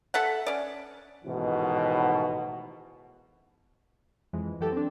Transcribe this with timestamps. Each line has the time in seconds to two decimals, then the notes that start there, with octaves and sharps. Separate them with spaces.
0.14 A4 E5 F#5
0.47 C#4 D5
1.25 A1 G#2 B2 D#3 E3 F#4
4.33 F2 E3 G#3
4.61 E3 F#3 G4 A4
4.72 C4 D4